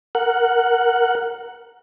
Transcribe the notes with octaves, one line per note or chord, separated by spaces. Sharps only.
A#4 F#5